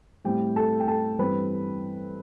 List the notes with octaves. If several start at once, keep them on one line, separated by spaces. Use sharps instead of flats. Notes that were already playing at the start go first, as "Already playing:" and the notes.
A2 G3 C4 G4 G5
A4 A5
G5
A4 A5
G2 E3 G3 C4 B4 B5